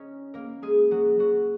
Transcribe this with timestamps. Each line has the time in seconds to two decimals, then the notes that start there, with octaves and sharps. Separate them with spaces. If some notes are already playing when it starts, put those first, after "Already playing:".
Already playing: C#4 D#4 C#5 D#5
0.34 A#3 A#4
0.62 G#3 G#4
0.91 F#3 F#4
1.19 F#3 F#4